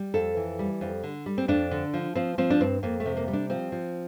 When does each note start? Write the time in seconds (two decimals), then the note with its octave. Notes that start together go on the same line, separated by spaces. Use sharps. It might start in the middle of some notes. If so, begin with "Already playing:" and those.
Already playing: G3
0.14 F2 A4
0.37 E3
0.59 G3
0.81 F2
1.04 D3
1.26 G3
1.38 C4
1.48 F2 D4
1.71 D3
1.94 F3
2.15 F3 C4
2.38 F3 C4
2.50 D4
2.61 G2 C4
2.83 F2 A#3
3.00 A3
3.06 C3
3.17 A#3
3.28 G3
3.33 D4
3.50 F3 C4
3.72 F3